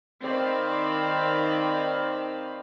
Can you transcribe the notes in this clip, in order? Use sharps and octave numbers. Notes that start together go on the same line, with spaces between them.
D#3 C4 D5 F5 B5